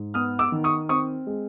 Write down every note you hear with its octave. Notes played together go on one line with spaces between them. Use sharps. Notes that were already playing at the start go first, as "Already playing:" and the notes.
Already playing: G#2
B3 D#6 F6
D6 E6
D#3
C#6 D#6
C4 C#6 D#6
G#3